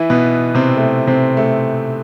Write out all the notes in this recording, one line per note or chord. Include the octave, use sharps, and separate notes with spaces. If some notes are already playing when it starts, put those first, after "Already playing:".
Already playing: E3 E4
B2 B3
C3 C4
A3
C3 C4
A3